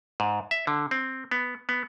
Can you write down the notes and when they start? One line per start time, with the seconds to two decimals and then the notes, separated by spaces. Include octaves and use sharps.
0.20 G#2
0.51 E5
0.67 D3
0.91 C4
1.31 B3
1.69 B3